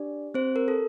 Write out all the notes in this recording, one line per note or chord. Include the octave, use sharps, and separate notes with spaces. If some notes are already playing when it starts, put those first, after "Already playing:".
Already playing: D4 G4 D5
C4 C5
A#4
A4